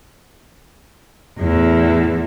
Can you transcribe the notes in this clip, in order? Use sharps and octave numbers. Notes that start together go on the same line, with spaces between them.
E2 A2 E3